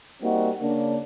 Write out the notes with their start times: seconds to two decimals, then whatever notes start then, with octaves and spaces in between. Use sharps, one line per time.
0.23 G3 A#3 C4 D#4 F#4
0.61 C#3 A#3 D4